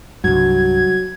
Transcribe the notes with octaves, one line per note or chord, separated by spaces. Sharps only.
C2 G2 F#3 G#6